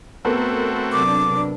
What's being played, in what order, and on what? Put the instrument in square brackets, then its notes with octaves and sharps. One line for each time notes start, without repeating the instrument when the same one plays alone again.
[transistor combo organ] A3 C4 F#4 [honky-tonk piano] B3 A4 A#4
[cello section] C3 F#3 D4 [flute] D6